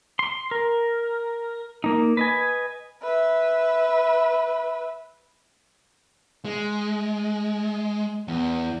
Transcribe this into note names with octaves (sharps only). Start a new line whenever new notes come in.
C6
A#4
A#3 D#4
B4 D#5 G#5
B4 E5
G#3
E2